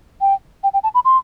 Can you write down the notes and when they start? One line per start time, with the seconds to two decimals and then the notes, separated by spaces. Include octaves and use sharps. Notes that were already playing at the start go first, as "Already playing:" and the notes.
0.21 G5
0.63 G5
0.73 G5
0.83 A5
0.95 B5
1.05 C6